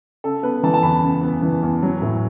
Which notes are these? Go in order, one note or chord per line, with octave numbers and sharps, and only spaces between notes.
C#3 A4
B3 B4
E3 A5
A5
E2 B5
C#3
B3
E3
E2
F#3
A2